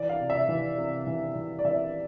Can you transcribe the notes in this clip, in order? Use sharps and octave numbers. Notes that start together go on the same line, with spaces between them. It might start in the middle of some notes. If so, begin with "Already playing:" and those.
Already playing: E3 D5
F5
C3
E5
E3
C3
E3
E3
D5
E3 E5